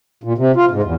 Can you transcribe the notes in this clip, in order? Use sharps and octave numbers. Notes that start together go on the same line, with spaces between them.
A#2
C3
F4
G#2
E2